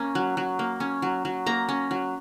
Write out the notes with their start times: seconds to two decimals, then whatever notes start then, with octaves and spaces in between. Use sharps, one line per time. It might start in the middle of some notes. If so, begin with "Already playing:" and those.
Already playing: A#3 C#4
0.15 F#3
0.37 F#3
0.59 A#3
0.80 C#4
1.02 F#3
1.25 F#3
1.46 A#3 A#5
1.69 C#4
1.91 F#3